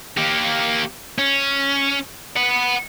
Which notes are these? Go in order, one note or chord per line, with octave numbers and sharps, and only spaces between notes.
A#3 G4
C#4
F#5 B5